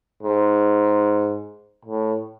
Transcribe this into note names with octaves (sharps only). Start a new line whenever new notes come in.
G#2
A2